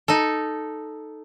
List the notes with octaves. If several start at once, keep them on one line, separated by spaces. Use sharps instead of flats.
D#4 A4